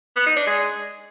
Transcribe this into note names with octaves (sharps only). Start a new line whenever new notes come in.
B3
D#4
D4
G#3